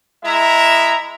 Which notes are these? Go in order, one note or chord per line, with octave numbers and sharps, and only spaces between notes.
G#3 E4 E5 A#5